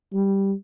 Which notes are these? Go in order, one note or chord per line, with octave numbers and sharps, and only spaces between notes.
G3